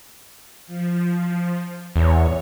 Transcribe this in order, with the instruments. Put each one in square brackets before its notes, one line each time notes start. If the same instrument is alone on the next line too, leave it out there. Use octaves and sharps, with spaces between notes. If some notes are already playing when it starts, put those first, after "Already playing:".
[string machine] F3
[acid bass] E2 [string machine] C#5